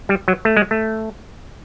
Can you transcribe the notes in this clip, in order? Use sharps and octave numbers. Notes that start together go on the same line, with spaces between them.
G3
F#3
A3
G#3
A3